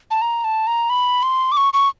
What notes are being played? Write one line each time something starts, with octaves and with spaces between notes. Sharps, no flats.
A5
A#5
A5
A#5
B5
C6
D6
C#6
C#6